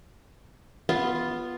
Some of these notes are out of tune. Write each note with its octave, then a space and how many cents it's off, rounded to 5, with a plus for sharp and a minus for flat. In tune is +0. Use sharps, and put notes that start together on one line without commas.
B3 +0 F4 +0